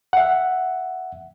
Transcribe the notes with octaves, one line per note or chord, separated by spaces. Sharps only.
E5 F#5